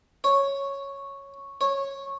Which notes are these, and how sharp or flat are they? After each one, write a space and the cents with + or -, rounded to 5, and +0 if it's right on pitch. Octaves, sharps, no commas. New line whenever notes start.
C#5 -5
C#5 -15